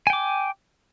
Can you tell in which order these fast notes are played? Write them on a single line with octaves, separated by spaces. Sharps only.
G#5 G5 D6